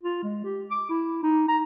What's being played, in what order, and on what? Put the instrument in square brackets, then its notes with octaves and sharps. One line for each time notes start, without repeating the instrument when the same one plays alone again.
[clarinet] F4
G#3
G4
D6
E4
D#4
A#5